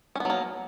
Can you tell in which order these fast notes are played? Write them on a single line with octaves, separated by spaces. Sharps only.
C#4 B3 F#3 A#3